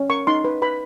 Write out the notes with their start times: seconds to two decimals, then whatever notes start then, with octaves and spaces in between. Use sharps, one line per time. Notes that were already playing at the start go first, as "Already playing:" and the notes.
Already playing: C#4
0.10 A#4 C#6
0.27 D#4 C6
0.45 B4
0.62 B4 B5